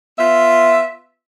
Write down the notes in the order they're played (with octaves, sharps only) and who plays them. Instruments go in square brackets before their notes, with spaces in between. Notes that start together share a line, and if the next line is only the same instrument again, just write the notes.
[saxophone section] B3 F4 E5